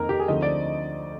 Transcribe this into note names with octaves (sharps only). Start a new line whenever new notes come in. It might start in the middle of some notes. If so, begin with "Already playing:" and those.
Already playing: F2 D#3 A#3 D#4 A#4
G4
G#4
D2 D3 F3 C4 D#4 D#5
D5